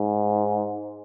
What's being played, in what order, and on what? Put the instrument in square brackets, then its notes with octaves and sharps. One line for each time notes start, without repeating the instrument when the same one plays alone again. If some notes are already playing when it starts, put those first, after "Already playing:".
Already playing: [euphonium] G#2